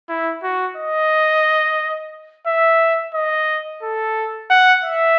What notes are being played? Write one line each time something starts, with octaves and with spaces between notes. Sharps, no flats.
E4
F#4
D#5
E5
D#5
A4
F#5
E5